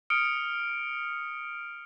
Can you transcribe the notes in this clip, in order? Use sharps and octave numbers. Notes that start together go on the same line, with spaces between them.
D#6 F6 C#7 D7